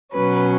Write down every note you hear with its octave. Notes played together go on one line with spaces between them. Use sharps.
B2 F#3 C#4 B4